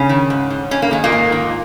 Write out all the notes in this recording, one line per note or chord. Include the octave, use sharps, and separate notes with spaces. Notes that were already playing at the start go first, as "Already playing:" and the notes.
Already playing: C#3 C#4
D#3
G#2
G#2
G#2 C#4
A#3
D#3 G#3
A#2 A#3
G#2
D#3